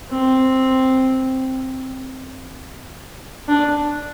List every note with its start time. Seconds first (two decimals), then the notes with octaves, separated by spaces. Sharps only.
0.11 C4
3.48 D4